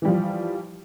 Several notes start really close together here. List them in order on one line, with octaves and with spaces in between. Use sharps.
E3 G3 F3